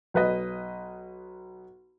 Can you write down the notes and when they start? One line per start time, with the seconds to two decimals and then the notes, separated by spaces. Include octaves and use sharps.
0.14 B1 B4 D#5